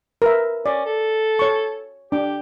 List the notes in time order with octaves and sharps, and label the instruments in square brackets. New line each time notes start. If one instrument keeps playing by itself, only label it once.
[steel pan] A#4 B4 E5
[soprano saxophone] C#4 [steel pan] D5
[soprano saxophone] A4
[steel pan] C#5 C#6
[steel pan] D4 [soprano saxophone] G4